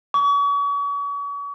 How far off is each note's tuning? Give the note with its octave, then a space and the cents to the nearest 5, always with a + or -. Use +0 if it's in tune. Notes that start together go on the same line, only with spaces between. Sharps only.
C#6 +40